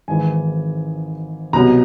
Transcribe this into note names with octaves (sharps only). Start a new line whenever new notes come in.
G#1 G#2 E3 G#5
C2 B2 F#3 A#5